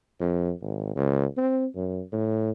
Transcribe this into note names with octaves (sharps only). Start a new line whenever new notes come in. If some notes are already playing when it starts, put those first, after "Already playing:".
F2
G#1
C#2
C4
F#2
A2